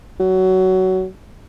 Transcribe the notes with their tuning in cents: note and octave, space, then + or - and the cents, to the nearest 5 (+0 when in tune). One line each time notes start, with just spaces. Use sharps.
F#3 +20